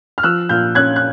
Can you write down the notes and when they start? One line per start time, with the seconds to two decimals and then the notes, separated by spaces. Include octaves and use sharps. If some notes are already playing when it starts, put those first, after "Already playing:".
0.18 F6
0.23 F3 E6 F#6
0.49 A#2 F6 G6
0.75 C#4 F#6 G#6
0.96 F#6